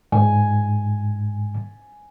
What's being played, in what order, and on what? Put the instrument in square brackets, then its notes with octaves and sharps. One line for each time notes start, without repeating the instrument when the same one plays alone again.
[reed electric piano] G#2 [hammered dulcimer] G#5